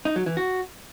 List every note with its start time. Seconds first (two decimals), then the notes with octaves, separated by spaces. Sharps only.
0.05 D#4
0.16 F#3
0.26 E3
0.37 F#4